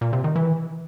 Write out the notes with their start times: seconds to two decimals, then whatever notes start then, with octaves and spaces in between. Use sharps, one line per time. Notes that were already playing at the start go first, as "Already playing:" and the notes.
0.01 A#2
0.13 C3
0.24 D#3
0.36 E3